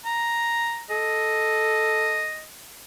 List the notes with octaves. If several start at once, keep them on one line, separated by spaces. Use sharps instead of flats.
A#5
A4 D#5